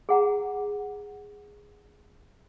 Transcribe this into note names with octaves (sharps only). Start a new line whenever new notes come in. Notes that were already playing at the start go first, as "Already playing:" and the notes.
G#4 F#5 A#5